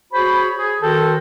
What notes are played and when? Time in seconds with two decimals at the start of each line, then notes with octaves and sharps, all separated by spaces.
0.13 F#4 G#4 C5 C#5 B5
0.57 G#4
0.82 D#3 F#4 A4 C5 G5 A5